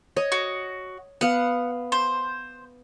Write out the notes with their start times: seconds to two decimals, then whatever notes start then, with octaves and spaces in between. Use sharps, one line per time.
0.17 C#5 D#5
0.32 F#4
1.21 B3 F5 F#5
1.92 C5